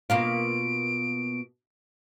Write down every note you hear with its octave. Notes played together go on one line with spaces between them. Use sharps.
B2 A#3 F4 D7